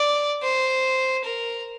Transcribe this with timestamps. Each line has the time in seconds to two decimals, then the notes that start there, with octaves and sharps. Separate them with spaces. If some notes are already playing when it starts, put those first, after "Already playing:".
Already playing: D5
0.43 C5
1.24 A#4